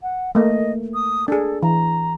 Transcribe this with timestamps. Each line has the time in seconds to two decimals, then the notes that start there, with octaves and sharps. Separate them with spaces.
0.03 F#5
0.35 A3 A#3 D#5
0.94 D#6
1.28 D4 G#4 A4
1.63 E3 A#5